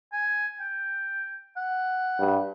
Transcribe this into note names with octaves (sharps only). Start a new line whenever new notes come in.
G#5
G5
F#5
G2